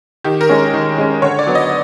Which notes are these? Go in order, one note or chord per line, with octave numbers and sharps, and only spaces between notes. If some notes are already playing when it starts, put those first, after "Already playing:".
D#3 G4
A#4
G#3 C#4
D#3
G#3 C#4
D3 C#5
D5
F#3 B3
D#5